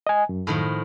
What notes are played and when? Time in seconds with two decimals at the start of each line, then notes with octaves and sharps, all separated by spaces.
0.07 D#5 G#5
0.29 F#2
0.47 A2 D#3 F3